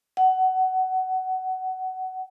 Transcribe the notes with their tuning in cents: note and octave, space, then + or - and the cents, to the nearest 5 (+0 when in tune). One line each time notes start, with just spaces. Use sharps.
F#5 +20